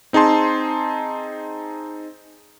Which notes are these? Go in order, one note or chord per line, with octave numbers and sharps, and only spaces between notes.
C4 D#4 G#4 A5 C6